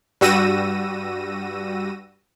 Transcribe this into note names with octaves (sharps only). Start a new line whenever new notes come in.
G2 G3 F#4 E6 A#6 D#7